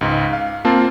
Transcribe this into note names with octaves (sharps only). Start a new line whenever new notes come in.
C#2 G#2
F5
A#3 C4 F4 A5